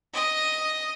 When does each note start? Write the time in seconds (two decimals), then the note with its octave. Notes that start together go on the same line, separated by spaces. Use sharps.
0.14 D#5